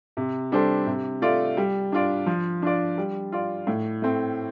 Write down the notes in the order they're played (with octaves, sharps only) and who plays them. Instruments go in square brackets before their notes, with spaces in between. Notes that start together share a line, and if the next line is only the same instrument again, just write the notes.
[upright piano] C3
G3 D4 A4 C5
C3
A3 F4 D5
G3
D4 F4 D5
F3
D4 F4 D5
G3
F4 D5
A2
A3 C4